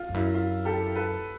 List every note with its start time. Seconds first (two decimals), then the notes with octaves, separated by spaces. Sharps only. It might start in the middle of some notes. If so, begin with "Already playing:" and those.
Already playing: F4
0.09 F2
0.14 F#2 E4
0.34 F4
0.65 G4 A4
0.96 A4 B4